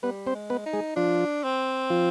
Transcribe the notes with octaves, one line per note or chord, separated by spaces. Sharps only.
G3 B3 B4
C4 C5
G#3
B3 B4
D#4
G#3 G#4
F3 D4 F4
C4
F3 F4